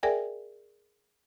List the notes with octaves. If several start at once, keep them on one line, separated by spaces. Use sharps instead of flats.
G#4 A#4 D5 E5 G5 G#5